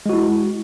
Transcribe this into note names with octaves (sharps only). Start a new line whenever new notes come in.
G#3 E4 F#4